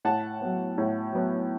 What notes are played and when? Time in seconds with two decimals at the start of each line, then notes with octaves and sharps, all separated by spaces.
0.05 A2 F#5 A5
0.41 F#3 B3
0.78 A2
1.13 F#3 B3